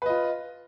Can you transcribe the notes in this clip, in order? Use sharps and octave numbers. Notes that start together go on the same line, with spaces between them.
F4 B4 D#5